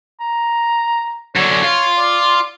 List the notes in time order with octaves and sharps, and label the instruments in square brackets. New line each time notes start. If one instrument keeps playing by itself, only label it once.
[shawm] A#5
[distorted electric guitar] F#2 D3 [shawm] C#5
[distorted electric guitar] F4
[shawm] D5